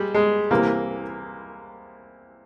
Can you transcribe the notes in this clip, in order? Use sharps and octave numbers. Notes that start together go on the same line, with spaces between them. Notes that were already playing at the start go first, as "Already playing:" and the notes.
Already playing: G3 G#3
G#3
C2 C3 E3 A#3